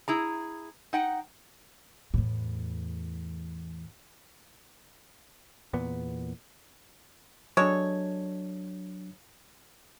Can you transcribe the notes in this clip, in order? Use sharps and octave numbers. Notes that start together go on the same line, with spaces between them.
E4 G#4 A#5
D#4 F#5 G5
E2 A2
E2 A#2 B3
F#3 G#3 D4 A4 C#5